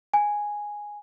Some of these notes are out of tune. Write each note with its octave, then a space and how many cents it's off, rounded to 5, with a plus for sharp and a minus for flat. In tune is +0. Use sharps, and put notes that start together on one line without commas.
G#5 -5